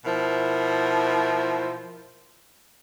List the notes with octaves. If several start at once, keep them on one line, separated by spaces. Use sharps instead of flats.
B2 F3 E4 A#4